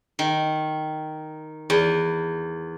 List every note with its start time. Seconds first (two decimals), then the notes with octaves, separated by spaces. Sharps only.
0.19 D#3
1.70 E2